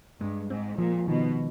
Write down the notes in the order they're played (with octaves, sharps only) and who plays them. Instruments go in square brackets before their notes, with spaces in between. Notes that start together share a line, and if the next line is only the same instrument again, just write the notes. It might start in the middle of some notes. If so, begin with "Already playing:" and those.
[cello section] G2 [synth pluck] G#3
[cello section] G#2 [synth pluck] C4
[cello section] A#2 [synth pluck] F3
[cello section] B2 [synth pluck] D#3